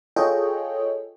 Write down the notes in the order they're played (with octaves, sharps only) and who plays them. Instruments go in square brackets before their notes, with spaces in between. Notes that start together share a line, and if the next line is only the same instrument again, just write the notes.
[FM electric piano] F4 G#4 A4 C#5 D#5 G5